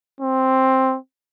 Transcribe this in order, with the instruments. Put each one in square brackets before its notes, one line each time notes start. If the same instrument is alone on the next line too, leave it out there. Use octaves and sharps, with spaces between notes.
[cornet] C4